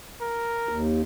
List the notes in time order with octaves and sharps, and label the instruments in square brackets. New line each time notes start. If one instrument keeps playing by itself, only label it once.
[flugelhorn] A#4
[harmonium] D#2